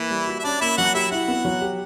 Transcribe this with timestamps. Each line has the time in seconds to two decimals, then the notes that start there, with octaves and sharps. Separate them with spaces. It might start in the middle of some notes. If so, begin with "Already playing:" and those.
Already playing: E3 A#3 E4
0.11 G3
0.27 F#4
0.39 E5
0.44 C#4 D4 D5
0.61 A#3 E4 E5
0.77 F#3 F#4 F#5
0.95 E4 G4 E5
1.11 E4 F#4 F#5
1.28 B3
1.45 F#3
1.61 G4